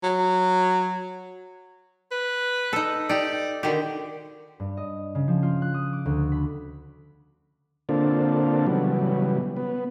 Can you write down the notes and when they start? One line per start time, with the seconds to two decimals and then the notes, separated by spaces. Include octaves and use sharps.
0.03 F#3
2.12 B4
2.73 D#4 A4
3.09 D#4 G4 D5
3.63 D3 D#3 F#4 G4
4.60 G2
4.77 D#5
5.15 C#3
5.28 F3
5.43 F4
5.62 F#6
5.74 D#6
5.93 D6
6.05 D2
6.32 B5
7.89 D3 A#3 C4 D4 F4 A4
8.67 C#3 E3 F#3 G3 B3
9.56 B3